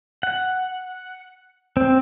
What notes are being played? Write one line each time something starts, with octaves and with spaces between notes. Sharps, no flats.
F#5
C4